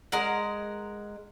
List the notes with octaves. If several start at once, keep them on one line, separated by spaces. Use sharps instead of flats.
G#3 A#4 F#5